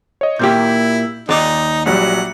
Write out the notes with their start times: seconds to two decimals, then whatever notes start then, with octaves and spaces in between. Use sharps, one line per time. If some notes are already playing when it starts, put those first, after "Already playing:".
0.21 C#5 D#5
0.39 A#2 A#3 E4 G4 G6
1.29 D#2 D#4 D5
1.86 A#1 F#3 G3 F#5